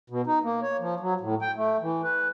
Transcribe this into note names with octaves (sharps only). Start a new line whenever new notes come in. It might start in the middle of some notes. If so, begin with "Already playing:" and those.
B2
D#4
A#3
C#5
F3
F#3
A2
G5
A3
E3
B4